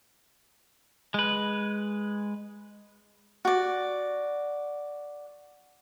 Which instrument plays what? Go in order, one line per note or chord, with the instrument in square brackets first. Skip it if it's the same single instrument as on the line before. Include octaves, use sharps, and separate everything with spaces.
[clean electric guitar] G#3 B4
[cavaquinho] F#4 D5